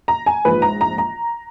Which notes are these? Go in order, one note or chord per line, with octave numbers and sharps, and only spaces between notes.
A#5
G#5
A#1 G#2 F3 B4
A#5
A#5
A#5